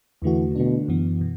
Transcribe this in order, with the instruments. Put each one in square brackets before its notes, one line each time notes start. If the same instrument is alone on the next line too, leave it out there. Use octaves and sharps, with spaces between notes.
[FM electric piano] E2 D3 A3 F#4 [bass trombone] E3
[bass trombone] B2 [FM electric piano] D3 A3 D4
[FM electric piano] F#2 E3 B3
B2